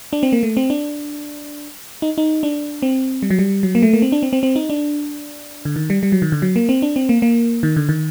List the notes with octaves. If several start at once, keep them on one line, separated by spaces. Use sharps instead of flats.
D4
C4
A#3
A3
C4
D4
D#4
D#4
D4
C4
G3
F#3
G3
F#3
A#3
A3
A#3
C4
D4
C4
C4
C4
D#4
D4
D3
D#3
G3
G3
F#3
D#3
D3
F#3
A#3
C4
D4
C4
A#3
A#3
D#3
D3
D#3